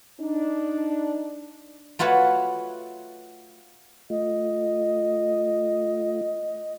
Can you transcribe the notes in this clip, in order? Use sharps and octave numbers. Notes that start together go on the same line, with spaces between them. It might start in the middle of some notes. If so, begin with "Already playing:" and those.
D4 D#4
A3 F4 F#4 B4 C#5 F#5
A3 F4 D#5